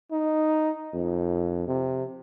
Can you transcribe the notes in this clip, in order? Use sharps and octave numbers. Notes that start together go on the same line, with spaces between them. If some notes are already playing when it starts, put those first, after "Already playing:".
D#4
F2
C3